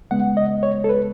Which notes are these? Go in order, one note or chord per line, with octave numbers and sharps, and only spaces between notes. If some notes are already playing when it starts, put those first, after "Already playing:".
C#3 G#3 B3 F#5
D#5
C#5
A4
B4